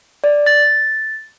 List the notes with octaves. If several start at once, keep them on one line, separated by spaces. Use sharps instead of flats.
D5
A6